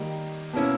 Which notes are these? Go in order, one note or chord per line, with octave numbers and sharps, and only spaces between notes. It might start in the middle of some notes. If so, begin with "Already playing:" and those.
Already playing: D#3 G3 A#3
B2 A#3 C#4 E4